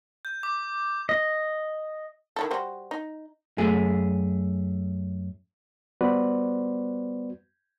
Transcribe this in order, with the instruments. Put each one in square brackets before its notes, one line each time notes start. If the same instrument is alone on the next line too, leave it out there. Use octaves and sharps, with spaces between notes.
[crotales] G6
D6
[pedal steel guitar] D#5
[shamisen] D#3 E4 A4
G3 F#4 C5
D#4
[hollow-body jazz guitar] F#2 A3 G#4
[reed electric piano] G3 B3 F#4 B4 C5 D5